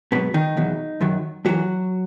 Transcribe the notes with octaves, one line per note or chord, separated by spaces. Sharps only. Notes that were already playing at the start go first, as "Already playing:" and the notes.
G#2 B2 F#3 B3
D#3 D#4
E2 B2 F#3
F#2 D#3 F#3
F#2 E3 F#3 F#4